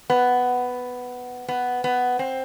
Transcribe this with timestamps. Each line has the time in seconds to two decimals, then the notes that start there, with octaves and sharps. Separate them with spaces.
0.10 B3
1.48 B3
1.84 B3
2.19 C4